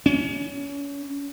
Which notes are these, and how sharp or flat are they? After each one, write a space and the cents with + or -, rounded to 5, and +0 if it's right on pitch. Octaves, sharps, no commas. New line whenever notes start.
C#4 +30